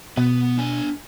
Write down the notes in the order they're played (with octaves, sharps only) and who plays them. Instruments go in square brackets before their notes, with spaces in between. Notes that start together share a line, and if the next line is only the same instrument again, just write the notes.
[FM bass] B2 [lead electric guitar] B3
[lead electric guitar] D4 G#5